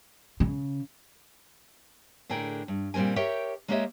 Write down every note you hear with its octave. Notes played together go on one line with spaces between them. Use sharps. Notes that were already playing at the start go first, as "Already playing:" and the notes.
C#3
A2 D3 G#4 A#4 G5
G2
A#2 G3 C4 A#4 G#5
G4 A#4 C#5 E5 G5
G#3 A#3 G4 C#5 D#5 E5